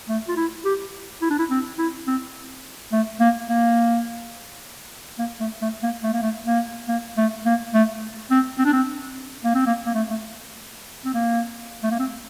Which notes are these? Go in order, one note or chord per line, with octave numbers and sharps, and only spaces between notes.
A3
F4
E4
G4
E4
D4
E4
C4
E4
C4
A3
A#3
A#3
A#3
A3
A3
A#3
A3
A#3
A3
A#3
A#3
A3
A#3
A3
C4
C4
D4
C4
A#3
C4
A#3
A#3
A3
A3
C4
A#3
A3
A#3
C4